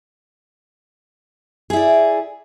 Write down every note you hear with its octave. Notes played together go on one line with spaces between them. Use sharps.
E4 G#4 D5